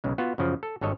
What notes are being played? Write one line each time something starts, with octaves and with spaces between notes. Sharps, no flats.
B1 C#3 G#3
B3 F4 F#4
F#2 C#3 F3
A4
G#1 G2 A4 C#5 D#5